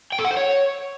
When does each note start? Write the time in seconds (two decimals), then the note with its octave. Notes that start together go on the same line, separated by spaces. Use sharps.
0.12 G5
0.18 A4
0.25 F#5
0.31 C5
0.37 C#5